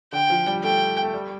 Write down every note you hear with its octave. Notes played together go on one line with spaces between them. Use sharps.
D3 G5
F3
G3
A3 G5
A3
G3